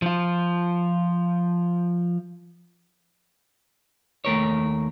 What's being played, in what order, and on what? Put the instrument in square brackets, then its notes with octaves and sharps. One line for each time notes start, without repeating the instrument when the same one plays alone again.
[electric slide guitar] F3 F4
[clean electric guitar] D#2 A3 A#4 C#5